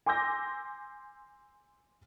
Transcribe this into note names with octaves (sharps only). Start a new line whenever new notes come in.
G#5 C6 D6 E6 G6 A#6